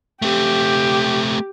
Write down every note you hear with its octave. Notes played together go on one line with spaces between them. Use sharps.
A3 C4 G4